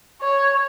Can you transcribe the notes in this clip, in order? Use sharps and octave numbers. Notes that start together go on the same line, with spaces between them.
C#5